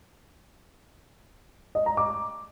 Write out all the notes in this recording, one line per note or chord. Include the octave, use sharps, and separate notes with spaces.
D#5
A#5
D6